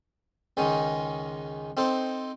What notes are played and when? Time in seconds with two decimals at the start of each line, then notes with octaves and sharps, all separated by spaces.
0.57 C#2 D#3 G#3 C#4 D#4
1.77 C4 D#4 A4 C5